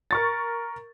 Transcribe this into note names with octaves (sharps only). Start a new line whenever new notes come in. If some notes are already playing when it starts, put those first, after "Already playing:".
A#4 C#6 A6